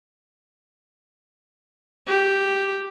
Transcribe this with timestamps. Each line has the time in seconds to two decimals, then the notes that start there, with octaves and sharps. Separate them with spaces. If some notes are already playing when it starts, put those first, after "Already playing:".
2.08 G4